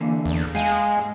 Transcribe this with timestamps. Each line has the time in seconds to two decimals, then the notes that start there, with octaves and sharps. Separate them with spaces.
0.01 D3 E3 A#3
0.25 E2
0.55 G#3 F5 G5 G#5
0.97 G#2